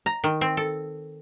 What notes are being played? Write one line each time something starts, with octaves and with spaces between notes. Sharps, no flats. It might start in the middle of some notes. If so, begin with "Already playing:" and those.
A#5
D#3
C4
A4